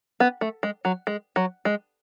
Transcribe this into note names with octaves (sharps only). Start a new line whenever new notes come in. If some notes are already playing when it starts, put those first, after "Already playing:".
B3
A3
G#3
F#3
G#3
F#3
G#3